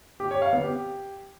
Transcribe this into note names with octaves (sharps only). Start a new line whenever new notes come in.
G4
C#5
F5
B3
G4